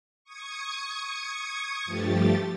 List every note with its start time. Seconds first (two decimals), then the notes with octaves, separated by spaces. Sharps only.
0.24 C#6 D#6 G#6 C#7
1.85 G2 F3 A3 G4 A6